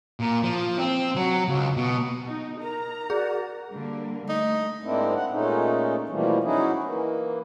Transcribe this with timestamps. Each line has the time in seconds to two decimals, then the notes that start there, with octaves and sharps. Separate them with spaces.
0.20 A#2
0.43 F3
0.78 C4
1.16 F#3
1.48 C#2
1.77 B2
2.28 D#4
2.62 A#4 A#5
3.10 F#4 G#4 D5
3.72 D3 G3 A#3
4.29 A3 D#4
4.83 G#2 G#3 A#3 C4 D4 E4
5.15 F#5
5.31 A#2 G#3 A3 C#4 D#4
6.09 B2 E3 F3 G3 A3 A#3
6.44 F#3 C#4 D#4 E4 F#4 G#4
6.83 E3 A#3